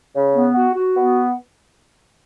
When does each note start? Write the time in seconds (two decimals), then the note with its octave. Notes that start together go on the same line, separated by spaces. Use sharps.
0.13 C#3
0.33 B3
0.53 F#4
0.74 F#4
0.95 B3